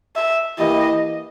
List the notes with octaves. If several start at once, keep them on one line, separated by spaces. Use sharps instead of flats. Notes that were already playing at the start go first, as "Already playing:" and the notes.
E5
E3 A#3 E4 G4 D#5